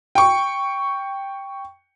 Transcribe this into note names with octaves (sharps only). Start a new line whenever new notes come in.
G5 C#6